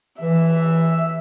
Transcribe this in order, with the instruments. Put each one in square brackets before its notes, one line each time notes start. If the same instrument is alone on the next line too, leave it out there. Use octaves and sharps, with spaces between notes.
[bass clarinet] E3 [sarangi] E5